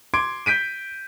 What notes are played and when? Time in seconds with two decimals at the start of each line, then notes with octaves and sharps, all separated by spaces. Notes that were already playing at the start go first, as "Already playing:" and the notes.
0.14 C6 D6 G#6 D7
0.46 G6 B6 D7 D#7